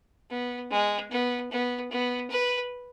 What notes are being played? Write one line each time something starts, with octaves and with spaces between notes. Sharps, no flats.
B3
G#3
B3
B3
B3
B4